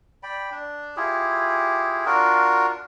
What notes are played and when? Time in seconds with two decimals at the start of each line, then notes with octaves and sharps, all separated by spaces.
0.23 D5 G5 B5
0.51 D4
0.97 E4 F4 G4 G#4
2.06 D4 F4 F#4 A#4